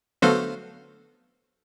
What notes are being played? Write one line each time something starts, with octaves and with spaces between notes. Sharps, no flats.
D3 F#3 A3 B3 C5 F5